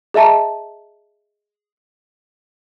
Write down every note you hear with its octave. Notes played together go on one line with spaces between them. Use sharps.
G#4 D#5 E5 A5 A#5